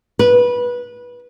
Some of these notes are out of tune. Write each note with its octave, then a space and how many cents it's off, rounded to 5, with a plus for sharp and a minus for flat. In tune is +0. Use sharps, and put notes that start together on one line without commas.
B4 -20